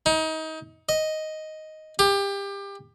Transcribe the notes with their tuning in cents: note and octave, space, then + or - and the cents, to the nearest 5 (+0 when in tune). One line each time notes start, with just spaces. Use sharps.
D#4 +30
D#5 +5
G4 +25